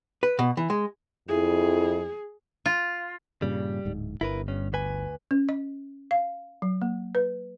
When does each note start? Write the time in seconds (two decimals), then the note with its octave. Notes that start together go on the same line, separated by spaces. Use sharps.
0.23 B4
0.39 B2
0.57 E3
0.70 G#3
1.28 F2 E4 G#4
2.66 F4
3.42 G2 A#2 C#3 G3
3.85 D1 G#2
4.21 G1 E4 A#4 B4
4.48 G2 C#4
4.73 D2 B4 G#5
5.31 C#4
5.49 D#5
6.11 F5
6.62 F#3
6.82 A#3
7.15 B4